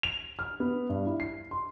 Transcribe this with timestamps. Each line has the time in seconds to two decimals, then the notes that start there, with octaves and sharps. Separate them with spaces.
0.03 F7
0.39 F6
0.60 B3
0.89 G2
1.07 E4
1.20 C7
1.51 C6